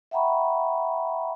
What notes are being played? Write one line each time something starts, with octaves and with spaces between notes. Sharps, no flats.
E5 F#5 G5 A#5 B5 C#6